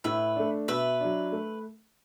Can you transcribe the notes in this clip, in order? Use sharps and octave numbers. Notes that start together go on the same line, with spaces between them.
A2 B4 E5
A3 D4
B2 B4 E5
F#3 D4
A3